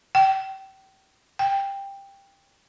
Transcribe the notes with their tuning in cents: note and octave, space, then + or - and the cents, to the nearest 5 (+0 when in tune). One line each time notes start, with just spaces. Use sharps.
G5 -30
G5 +15